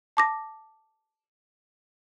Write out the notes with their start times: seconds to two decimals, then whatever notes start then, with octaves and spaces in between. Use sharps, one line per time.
0.17 A5 D6 A#6